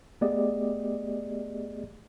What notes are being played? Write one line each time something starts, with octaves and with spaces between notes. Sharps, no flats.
A3 B3 G4 G#4 D5 D#5